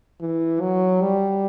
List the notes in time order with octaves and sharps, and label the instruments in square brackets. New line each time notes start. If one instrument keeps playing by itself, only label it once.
[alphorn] E3
F#3
G3